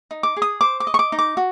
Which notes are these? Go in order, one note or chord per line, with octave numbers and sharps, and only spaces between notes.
D#4
D6
G#4
D#6
C5 D6
D6
D#5
C#6
D6
D#4
D6
F#4